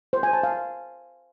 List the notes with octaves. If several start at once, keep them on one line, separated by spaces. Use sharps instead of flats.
C5
G#5
A5
F5